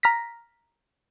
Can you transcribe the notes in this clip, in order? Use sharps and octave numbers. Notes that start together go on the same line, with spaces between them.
A#5 F6 A#6 B6